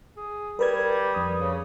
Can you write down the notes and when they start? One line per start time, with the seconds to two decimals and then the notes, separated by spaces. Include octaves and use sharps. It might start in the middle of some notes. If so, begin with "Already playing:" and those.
0.17 G#4
0.59 G3 A#4 B4 G#6
1.14 F2 D#6
1.40 C#3